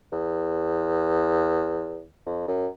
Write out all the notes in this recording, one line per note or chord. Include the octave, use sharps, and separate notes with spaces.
E2
F2
F#2